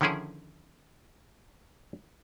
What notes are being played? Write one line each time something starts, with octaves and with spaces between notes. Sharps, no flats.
D3 D#3 F3 C#4 E4 G#4